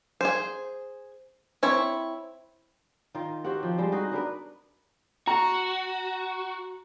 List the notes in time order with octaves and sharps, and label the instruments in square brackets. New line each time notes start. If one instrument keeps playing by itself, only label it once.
[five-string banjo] G#4 C5
C4 E4 C#5
[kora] D#3 F4 A#4
C4 F#4 G4 F#5
F3
G3 G#3 C5
D#4 F#4 G#4 D#5
B3 D4 A#4 B4
[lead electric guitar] F#4 [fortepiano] A#5